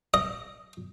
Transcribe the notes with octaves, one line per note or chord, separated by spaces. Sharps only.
D#5